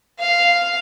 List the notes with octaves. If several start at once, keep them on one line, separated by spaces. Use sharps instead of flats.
F5